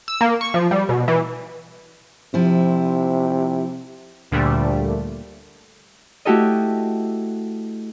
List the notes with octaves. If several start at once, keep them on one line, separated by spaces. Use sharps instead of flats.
E6
A#3
C#6
F3
G3
B2
E3
C3 F3 E4
D2 A#2 D3 G3 A3
A3 E4 F#4 G4 A4 D#5